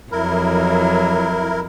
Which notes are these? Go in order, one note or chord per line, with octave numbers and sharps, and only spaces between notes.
F2 E3 F#3 E4 A#4